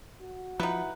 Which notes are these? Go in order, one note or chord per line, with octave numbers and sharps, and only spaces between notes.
F#4
F3 D#4 E4 B4 F#5